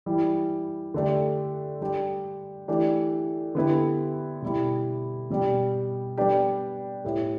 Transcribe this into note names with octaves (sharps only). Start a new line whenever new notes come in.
E3 G3 E4
D3 A3 D4 G4
G3 D4 G4
E3 A3 D4 G4
D3 B3 E4 G4
B2 G3 E4 G4
B2 G3 D4 G4
G3 B3 D4 G4
A2 A3 G4